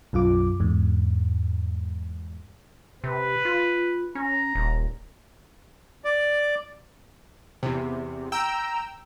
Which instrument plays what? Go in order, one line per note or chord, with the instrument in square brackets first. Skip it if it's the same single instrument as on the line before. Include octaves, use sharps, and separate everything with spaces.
[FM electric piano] B1 F#2 F4 D6
E2 G#2
[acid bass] C3 [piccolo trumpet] B4
[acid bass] F4
[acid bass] C#4 [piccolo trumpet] A#5
[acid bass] D#1
[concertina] D5
[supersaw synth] E2 C3
[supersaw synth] G5 E6 [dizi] A#5